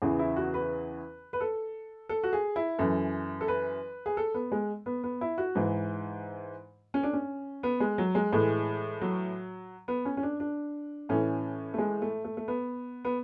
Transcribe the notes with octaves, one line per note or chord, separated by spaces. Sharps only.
E2 C#3 E3 G#4
E4
F#4
B4
B4
A4
A4
F#4
G#4
E4
F#2 E3 A4
A4
B4
G#4
A4
B3
G#3
B3
B3
E4
F#4
G#2 E3
C#4
D4
C#4
B3
G#3
F#3
G#3
A2 E3 G#3
F#3
B3
C#4
C#4
D4
D4
A2 E3 C#4
A3
G#3
A3
A3
A3
B3
B3